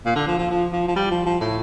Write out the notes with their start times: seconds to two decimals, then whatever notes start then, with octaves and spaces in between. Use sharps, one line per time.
0.05 A#2
0.15 D3
0.27 F3
0.39 F3
0.51 F3
0.72 F3
0.88 F3
0.96 G3
1.11 F3
1.26 F3
1.41 A2